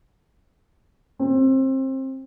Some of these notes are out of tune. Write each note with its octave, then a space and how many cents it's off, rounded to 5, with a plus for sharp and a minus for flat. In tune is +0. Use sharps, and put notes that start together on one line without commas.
C4 +25